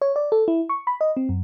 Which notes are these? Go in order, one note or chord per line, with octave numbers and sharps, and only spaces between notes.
C#5
D5
A4
E4
C#6
B5
D#5
C4
F#2